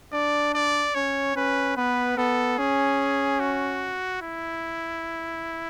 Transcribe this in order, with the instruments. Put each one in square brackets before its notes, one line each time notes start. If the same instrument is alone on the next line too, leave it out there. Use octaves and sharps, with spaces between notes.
[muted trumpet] D4 [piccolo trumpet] D5
[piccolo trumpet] D5
[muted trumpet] C#4 [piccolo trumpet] C#5
[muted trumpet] C#4 [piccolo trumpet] B4
[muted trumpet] B3 [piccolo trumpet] B4
[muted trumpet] B3 [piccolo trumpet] A4
[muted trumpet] C#4 [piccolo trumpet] G#4
[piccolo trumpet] F#4
E4